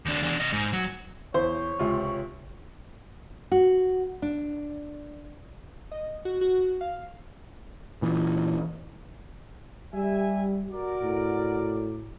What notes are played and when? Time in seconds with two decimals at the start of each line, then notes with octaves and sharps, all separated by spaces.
0.06 D#2 D4
0.22 E2 D4
0.40 C3 D#5
0.53 G#2
0.73 F#3
1.34 E2 C5 C#5
1.79 C#2 C3 F4
3.52 F#4
4.22 D4
5.91 D#5
6.25 F#4
6.41 F#4
6.81 F5
8.02 A#2 E3
9.93 G3 G4 E5 G#5
10.70 F#4 A#4 D5
11.01 A2